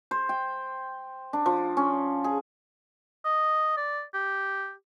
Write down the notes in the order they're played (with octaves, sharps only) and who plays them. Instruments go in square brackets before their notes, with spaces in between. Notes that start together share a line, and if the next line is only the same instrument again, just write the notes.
[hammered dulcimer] C5
G5
D4
F3
C#4
G#4
[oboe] D#5
D5
G4